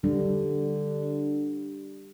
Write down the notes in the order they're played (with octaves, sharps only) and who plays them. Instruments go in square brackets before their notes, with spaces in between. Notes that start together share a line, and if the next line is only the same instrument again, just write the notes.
[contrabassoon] D3 [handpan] G3